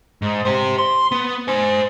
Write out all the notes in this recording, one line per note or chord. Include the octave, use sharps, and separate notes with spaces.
G#2
G4 C5
C6
B3
C5 G#5